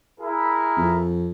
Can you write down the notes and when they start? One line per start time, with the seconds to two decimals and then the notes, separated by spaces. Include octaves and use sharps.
0.20 E4 G#4 A#4
0.77 F2